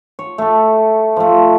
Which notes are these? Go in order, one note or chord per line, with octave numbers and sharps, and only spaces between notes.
C#5
A3 A4
F3 A3